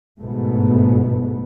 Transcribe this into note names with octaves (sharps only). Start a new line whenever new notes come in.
G1 G#2 B2 A3 B3